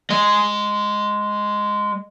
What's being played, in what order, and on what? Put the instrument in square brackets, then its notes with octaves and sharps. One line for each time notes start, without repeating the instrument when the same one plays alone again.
[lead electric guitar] G#3 D#5